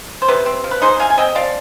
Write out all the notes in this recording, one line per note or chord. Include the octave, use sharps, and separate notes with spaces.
C5
C3 G4 B4
C4
F3
B4
D#4 G#4 C5
C3 F5 G#5
G#5
C4 D#5 G5
F3 D5 F5